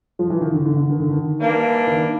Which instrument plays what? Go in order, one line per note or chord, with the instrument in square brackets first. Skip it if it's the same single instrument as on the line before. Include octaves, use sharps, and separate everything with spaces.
[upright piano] F3
E3
D#3
D3
D3
D3
D#3
D3
D#3
[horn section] E3 G3 A#3 D4
[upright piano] D#3